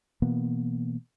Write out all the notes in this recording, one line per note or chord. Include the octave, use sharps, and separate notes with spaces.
B2 E3 A#3 B3